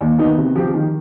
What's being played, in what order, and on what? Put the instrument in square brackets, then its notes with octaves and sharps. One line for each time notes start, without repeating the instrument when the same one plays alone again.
[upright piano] D#2
D#3 B3 D#4
C3
F3 C4 G4
D#3